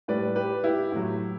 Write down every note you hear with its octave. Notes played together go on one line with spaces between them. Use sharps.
A2 G3 B4 D5
G4 B4
E4 G4
A2 F#3